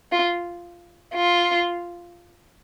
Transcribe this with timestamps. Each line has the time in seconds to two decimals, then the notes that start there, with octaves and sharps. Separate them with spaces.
0.12 F4
1.14 F4